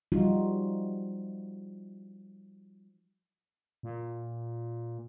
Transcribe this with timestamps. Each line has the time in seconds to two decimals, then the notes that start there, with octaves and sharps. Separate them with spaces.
0.12 F3 G3 D#4 F4 F#4
3.83 A#2